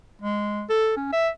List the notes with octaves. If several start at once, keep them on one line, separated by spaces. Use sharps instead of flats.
G#3
A4
C#4
E5